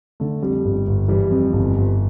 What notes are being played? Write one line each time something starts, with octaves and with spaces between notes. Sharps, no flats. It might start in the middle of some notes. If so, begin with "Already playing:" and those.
D3 A3
F2 G3
G1
G1
E3 G3
F2
G1
G1